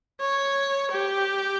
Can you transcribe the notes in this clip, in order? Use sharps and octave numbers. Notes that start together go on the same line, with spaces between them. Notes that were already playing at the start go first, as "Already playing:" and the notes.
C#5
G4